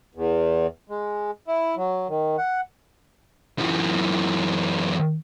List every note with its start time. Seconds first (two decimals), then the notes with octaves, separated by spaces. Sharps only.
0.15 E2
0.89 G#3
1.48 E4
1.77 F#3
2.09 D#3
2.38 F#5
3.58 F#2 E3